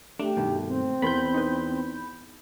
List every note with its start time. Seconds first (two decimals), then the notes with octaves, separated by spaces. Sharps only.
0.20 A3 D4 G4
0.37 G2 B2 D#3
0.67 C4
1.02 E2 B3 A#4 B5 C6 G6
1.34 D#4 B4